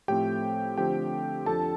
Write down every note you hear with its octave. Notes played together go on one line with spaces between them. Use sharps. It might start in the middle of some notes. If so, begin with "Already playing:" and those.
A2 F3 A3 C4 G4 G5
D3 F3 A3 C4 G4 G5
F2 F3 D4 A4 A5